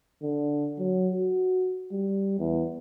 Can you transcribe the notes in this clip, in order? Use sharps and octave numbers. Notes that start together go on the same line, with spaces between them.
D3
F#3
F#4
G3
E2